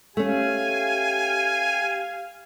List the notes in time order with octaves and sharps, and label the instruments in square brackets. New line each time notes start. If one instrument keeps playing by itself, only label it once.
[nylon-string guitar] A3 C#4 [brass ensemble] G4 F5 [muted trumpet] G#5